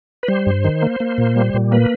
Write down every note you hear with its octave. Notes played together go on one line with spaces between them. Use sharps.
B4
G3 C5
G2
D#3
A#3
A#3
A#2
G3
A#2
A#3 B4